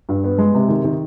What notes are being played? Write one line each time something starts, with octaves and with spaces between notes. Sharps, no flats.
G2
B3
G#3
C3
D#3
D#3